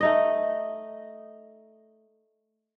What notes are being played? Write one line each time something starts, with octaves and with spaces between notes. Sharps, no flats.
A3 D#4 D#5